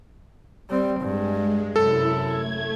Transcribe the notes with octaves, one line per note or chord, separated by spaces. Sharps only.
G3 C4
G2 G#3
F#2 C3 E4 A4
A3 G#6